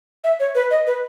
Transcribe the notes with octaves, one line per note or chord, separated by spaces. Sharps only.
E5
C#5
B4
D#5
B4